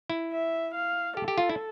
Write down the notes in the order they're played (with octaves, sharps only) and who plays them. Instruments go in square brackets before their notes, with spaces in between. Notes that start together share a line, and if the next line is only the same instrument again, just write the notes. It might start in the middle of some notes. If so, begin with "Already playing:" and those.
[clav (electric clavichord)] E4
[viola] E5
F5
[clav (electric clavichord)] G4 [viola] A4
[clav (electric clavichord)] G4
F4
E4